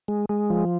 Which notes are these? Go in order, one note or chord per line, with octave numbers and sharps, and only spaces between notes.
G#3
G#3
F3